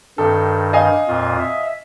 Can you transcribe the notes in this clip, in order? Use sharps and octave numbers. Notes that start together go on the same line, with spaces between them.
G2 D#3 A4
D#5 F5 G#5
F2 A#2 F4
E5